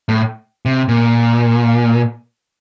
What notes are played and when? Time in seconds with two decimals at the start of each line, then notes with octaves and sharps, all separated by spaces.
0.09 A2
0.65 C3
0.88 A#2